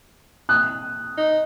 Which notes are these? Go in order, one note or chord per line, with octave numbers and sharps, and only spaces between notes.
D#6 F#6
D#4